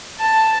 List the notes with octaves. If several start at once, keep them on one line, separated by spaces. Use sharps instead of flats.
A5